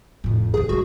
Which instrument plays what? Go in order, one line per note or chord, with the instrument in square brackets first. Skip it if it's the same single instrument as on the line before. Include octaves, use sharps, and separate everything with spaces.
[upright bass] F2 A2
[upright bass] D#3 D4 [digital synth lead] G#4
[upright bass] G3 G#3 [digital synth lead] F#4